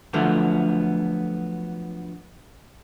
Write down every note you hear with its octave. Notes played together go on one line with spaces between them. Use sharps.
D3 F3 F#3 A3 B3